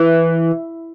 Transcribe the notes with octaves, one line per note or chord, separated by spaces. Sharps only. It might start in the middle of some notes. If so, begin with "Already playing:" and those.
Already playing: E3